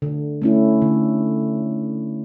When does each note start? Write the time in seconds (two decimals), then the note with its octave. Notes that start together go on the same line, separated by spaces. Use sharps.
0.02 D3
0.42 A3 C#4 E4
0.82 D3